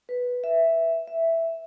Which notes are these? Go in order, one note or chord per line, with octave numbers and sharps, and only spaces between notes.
B4
E5
E5